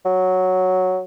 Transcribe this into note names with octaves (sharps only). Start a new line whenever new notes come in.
F#3